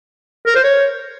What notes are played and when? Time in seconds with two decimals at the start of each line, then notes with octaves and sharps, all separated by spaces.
0.47 A#4
0.55 C5
0.64 C#5